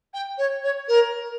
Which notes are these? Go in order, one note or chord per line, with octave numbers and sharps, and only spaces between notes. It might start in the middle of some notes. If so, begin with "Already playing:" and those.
G5
C#5
C#5
A#4